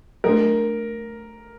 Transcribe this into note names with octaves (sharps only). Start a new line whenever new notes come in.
F#3 A3 D4 A#4